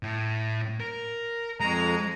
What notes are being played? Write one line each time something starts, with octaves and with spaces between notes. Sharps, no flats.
A2
A#4
F2 G#3 A#5